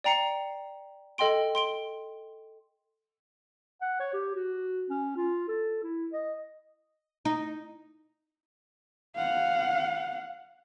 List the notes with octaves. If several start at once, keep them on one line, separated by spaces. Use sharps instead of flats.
D5 G5 A#5 C7 C#7
A4 D#5 G5 C6 D7
C6 D7 G7
F#5
C#5
G4
F#4
C#4
F4
A4
E4
D#5
D#4
F5 F#5